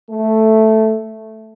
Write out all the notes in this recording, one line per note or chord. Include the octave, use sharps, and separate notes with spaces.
A3